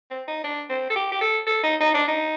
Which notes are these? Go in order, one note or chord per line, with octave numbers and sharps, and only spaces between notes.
C4
D#4
D4
C4
A4
G4
G4
A4
A4
D#4
D#4
D4
D#4